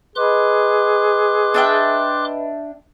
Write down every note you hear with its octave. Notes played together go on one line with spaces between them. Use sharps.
G#4 B4 D#5 B5 C6 D6 F#6
D4 E5 G5